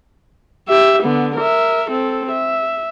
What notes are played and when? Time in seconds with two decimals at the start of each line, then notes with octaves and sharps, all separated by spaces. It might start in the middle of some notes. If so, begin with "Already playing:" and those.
0.68 G4 E5
1.03 D3 B3
1.36 A#4 E5
1.91 C4 A4
2.32 E5